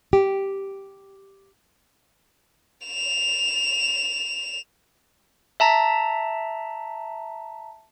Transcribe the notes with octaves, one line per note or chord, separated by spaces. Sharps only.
G4
E7 F7
E5 A5 A#5